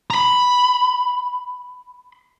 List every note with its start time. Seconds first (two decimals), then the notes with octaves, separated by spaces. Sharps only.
0.10 A#5 B5